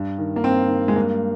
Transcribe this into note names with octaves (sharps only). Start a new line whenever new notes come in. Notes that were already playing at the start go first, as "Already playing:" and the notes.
Already playing: G2
D#3
A#3
G2 C4
D#3
G#3
G2 A#3